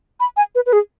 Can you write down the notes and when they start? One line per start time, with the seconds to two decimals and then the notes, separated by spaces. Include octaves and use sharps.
0.20 B5
0.37 G#5
0.55 B4
0.66 B4
0.73 G#4